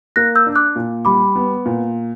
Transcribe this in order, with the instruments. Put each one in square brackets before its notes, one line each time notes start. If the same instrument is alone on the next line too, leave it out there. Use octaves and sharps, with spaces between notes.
[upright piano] A#3 [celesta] F#6 A#6
[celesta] E6 G6
[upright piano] D4
[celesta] D6 F#6
[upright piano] A#2
[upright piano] G3 [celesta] B5 D6
[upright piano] B3
A#2